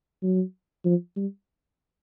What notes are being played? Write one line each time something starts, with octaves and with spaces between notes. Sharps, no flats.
F#3
F3
G3